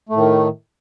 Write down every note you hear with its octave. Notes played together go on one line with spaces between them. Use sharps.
A2 D#3 A3